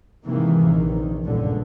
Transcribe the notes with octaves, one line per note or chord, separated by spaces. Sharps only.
G#2 C3 D#3 E3 A#3
A#1 D#3
C#2 G2 A#2 D3